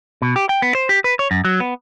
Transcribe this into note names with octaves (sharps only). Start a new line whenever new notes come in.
B2
G4
G5
B3
C5
G4
B4
C#5
F#2
F#3
B3